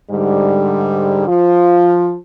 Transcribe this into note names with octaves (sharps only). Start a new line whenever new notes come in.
G#2 D3 G3
F3 F4